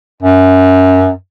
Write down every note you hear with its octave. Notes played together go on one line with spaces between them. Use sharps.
F#2